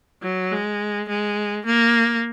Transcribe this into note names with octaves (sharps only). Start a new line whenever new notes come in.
F#3
G#3
G#3
A#3